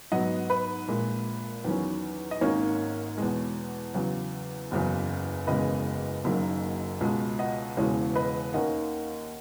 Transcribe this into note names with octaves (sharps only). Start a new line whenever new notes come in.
G#2 F#3 B3 D#5 F#5
B4
A#1 A#2 G#3
E2 D#3 F#3 C#4
D#5
G#1 G#2 D#3 A#3 C#4 C#5
E2 B2 G#3
E2 C#3 F#3
F#1 E2 C#3 F#3
F#1 E2 C#3 G#3 B3 B4 D#5
F#1 F#2 D#3 F#3 A#3
C#2 B2 G#3
D#5 F#5
E1 E2 C#3 E3 G#3 C#5
B4 D#5
D#2 D#3 A#3 C#4 D#5 F#5